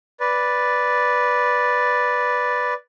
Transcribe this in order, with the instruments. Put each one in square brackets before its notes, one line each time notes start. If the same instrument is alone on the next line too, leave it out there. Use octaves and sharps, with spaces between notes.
[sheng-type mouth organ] B4 D5